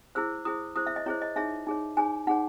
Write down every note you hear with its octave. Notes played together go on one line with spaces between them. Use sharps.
E4 G#4 C5 E6
E4 G#4 C5 D#6
E4 G#4 C5 D#6
E5
D#5
E4 G#4 C5 C#5
D#5
D#4 G#4 C#5 E5
D#4 G#4 C#5
D#4 G#4 C#5 G#5
D#4 G#4 C#5 F#5